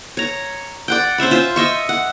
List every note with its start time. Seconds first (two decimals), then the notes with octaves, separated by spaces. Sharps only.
0.17 C#5 A#5
0.88 D5 F#5 G5
1.18 C#4 C5 E5 B5
1.31 F4 C5 E5
1.56 D#5 E5 C#6
1.89 F#5